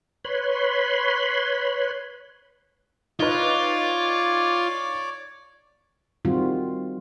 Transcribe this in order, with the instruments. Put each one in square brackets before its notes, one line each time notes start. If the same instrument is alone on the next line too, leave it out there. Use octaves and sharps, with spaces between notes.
[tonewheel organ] B4 C#5 B5 C6
[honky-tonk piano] D#4 B4 [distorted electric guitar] F4 [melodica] C#5 D5 D6
[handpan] D#3 G3 C4 F4 F#4